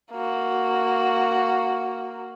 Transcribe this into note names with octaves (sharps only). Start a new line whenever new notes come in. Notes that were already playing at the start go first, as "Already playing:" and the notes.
A#3 F#4